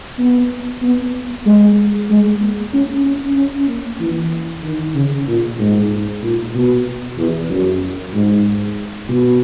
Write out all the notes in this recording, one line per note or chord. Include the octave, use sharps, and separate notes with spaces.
B3
B3
G#3
G#3
A#3
C#4
C#4
C#4
A#3
E3
D#3
C#3
A#2
G#2
A#2
B2
E2
F#2
G#2
B2